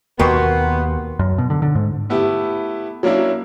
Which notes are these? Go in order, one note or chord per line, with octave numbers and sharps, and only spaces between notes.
D#2 B2 A#3 B3 F#4 A#4 G5 C6
F#2
B2
D3
D3
G#2
A3 B3 E4 G4
F#3 A#3 C#4 D4 E4